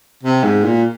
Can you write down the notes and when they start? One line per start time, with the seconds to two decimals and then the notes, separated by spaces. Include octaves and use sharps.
0.23 C3
0.44 G#2
0.64 A#2